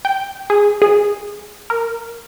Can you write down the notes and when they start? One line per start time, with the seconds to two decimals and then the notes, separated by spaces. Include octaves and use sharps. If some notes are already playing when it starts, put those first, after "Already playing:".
0.05 G5
0.50 G#4
0.82 G#4
1.70 A#4